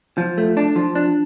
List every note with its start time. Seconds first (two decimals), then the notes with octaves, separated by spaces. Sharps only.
0.18 F3
0.38 A3
0.57 D4
0.76 F3
0.95 D4